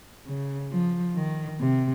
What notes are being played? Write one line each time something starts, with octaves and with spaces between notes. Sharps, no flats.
C#3
F3
D#3
C3